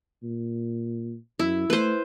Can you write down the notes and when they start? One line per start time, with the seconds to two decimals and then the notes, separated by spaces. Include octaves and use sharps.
0.23 A#2
1.39 F#2 E4
1.70 A3 B4 C5